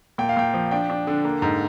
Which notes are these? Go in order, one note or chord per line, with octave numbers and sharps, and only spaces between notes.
A#2 G5
F5
A#2 G5
F3
D4 G5
D4
D3
A#3
G#2